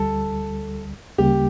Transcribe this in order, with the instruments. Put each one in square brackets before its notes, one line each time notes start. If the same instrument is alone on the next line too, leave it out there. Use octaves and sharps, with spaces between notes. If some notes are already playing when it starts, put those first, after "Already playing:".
Already playing: [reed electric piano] D2 D3 G3 [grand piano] A4
[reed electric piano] D2 C#3 G3 A#3 [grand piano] G4